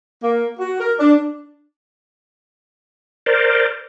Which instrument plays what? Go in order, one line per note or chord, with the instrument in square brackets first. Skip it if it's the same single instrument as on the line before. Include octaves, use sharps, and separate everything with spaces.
[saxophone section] A#3
F#4
A#4
D4
[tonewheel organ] A#4 C5 D5